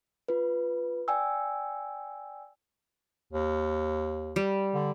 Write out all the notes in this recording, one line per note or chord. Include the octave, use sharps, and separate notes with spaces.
F4 B4
D5 G5 G#5 E6
D#2
G3
D3